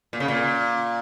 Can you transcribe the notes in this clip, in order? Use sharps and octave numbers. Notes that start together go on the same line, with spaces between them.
A#2
C#3
A#2